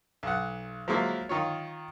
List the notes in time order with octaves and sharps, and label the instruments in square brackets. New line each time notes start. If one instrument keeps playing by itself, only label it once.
[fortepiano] B1 F#5
F3 F#3 G#3 A#3 E4
D#3 F4 C#5